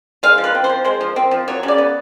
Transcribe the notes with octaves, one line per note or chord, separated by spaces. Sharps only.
G#3 F5
F3
B4
C4
C5
F3
G#3 C5
F3
C4
F3
F#3 C#5
C#3
D5
B3